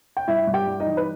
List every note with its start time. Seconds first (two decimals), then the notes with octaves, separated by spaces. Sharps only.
0.17 G5
0.28 G2 E4 E5
0.47 G2
0.53 G4 G5
0.67 G3
0.80 D#4 D#5
0.86 E3
0.97 B4